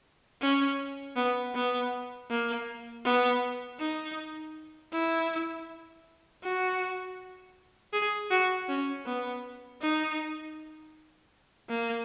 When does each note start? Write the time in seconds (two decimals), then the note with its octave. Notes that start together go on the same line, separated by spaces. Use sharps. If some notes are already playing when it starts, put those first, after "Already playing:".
0.42 C#4
1.16 B3
1.55 B3
2.30 A#3
3.05 B3
3.80 D#4
4.92 E4
6.43 F#4
7.93 G#4
8.31 F#4
8.69 C#4
9.06 B3
9.82 D#4
11.70 A#3